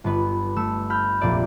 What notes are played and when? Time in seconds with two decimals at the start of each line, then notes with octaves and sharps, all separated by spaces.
0.04 G1 B3 B4
0.56 A3 E6
0.90 B5 F6 G6
1.21 F1 A#1 A#3 D5 E5